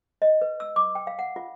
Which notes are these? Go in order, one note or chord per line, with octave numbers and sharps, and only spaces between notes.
D#5
B4
E6
D6
G5
F5
F#5
F4